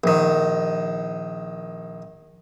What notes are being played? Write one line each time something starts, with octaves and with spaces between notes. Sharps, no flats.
A#1 D#3